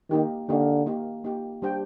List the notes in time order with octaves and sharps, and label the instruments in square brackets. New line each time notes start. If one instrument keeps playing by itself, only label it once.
[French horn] D#3 [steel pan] A#3 D#4 G4
[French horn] D3 [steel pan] A#3 D#4 G4
[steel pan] A#3 D#4 G4
A#3 D#4 G4
G3 D4 G4 C5 G5